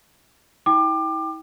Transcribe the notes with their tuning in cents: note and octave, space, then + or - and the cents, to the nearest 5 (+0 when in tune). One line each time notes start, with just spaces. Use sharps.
E4 -40 G5 +0 D6 +30